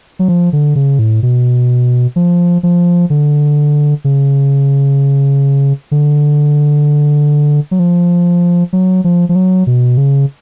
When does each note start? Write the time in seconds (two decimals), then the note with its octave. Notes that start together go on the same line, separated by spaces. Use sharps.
0.19 F#3
0.28 F3
0.53 D3
0.76 C#3
0.99 A2
1.23 B2
2.16 F3
2.63 F3
3.10 D3
4.04 C#3
5.91 D3
7.71 F#3
7.79 F3
8.73 F#3
9.04 F3
9.29 F3
9.35 F#3
9.67 B2
9.97 C#3